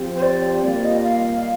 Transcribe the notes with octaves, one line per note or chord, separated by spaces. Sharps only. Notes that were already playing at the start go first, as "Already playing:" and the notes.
Already playing: F3 C4 G4
C5
D5
G3 A#3 F4 D5
D#5
F5